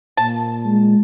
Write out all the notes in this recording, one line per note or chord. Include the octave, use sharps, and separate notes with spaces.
A#2 A5
G#3